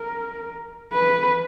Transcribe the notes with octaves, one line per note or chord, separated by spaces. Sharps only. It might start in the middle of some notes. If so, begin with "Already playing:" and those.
Already playing: A#4
B4